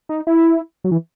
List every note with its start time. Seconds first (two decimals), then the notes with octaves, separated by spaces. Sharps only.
0.09 D#4
0.27 E4
0.84 F#3
0.91 E3